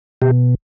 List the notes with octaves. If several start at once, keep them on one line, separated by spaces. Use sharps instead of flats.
B2 G4